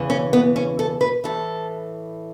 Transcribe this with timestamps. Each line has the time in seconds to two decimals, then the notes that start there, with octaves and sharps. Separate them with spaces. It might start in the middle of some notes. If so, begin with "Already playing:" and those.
Already playing: E2 C#3 E3
0.10 C#4
0.33 B3
0.56 C#4
0.79 A4
1.01 B4
1.24 A2 E3 A4